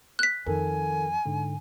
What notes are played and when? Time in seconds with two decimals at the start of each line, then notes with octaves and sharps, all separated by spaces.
0.19 F#6 B6
0.46 F2 D#3 A4 A#4 G#5
1.25 G#2 D3